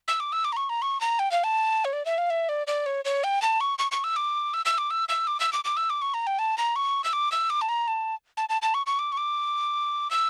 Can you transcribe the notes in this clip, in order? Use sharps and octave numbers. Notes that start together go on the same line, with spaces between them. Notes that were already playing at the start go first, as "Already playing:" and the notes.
E6
D6
E6
D6
A#5
C#6
A#5
C#6
A#5
G5
F5
A5
C#5
D5
E5
F5
E5
D5
D5
C#5
C#5
G5
A5
C#6
C#6
C#6
E6
D6
E6
E6
D6
E6
E6
D6
E6
D6
D6
E6
D6
C#6
A#5
G5
A5
A#5
C#6
E6
D6
E6
D6
A5
A#5
A5
A5
A5
A5
C#6
C#6
D6
C#6
D6
E6